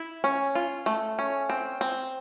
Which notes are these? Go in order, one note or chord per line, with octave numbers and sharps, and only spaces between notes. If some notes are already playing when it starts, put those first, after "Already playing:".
Already playing: E4
C#4
F4
A3
C#4
C4
C4